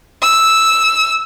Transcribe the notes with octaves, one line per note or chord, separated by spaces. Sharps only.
E6